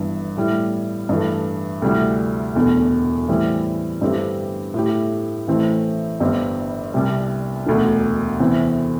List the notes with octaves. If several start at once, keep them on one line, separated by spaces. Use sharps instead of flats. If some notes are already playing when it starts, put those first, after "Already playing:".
Already playing: G1 G2 E3
A2 G3 E4
G2 E3 A3
D2 C3 G3 E4
E1 E2 D3 A3
A2 E3 G3 C4 E4
G2 D3 C4 E4 G4
A2 A3 E4 G4
A1 A2 E3 A3 C4
G1 G2 G3 C4
C2 C3 G3
E1 D2 D3
E2 C3 E3 C4